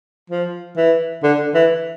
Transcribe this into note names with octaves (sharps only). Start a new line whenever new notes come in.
F3
E3
D3
E3